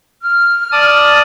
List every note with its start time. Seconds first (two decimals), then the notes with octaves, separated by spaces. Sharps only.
0.22 F6
0.72 D5 A5 D#6